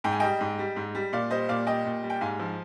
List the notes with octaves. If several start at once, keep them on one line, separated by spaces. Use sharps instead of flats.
G#2 G5
G#5
G3 D#5 G5
G#2
G3
G#2
G3
A#2 D5 F5
G3 C5 D#5
A#2 D5 F5
G3 D#5 G5
A#2
G3
G5
G#2 F5 G#5
F3